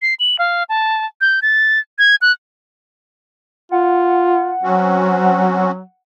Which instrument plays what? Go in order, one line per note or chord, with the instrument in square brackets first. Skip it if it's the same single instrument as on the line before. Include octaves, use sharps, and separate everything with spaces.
[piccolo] C7
F#7
F5
A5
G6
A6
G#6
F#6
[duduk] F4 [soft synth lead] F#5
[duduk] F#3 [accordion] C4 C#4 F#4